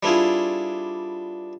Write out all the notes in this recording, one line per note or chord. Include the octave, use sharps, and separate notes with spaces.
G3 B3 D4 E4 F4 G#4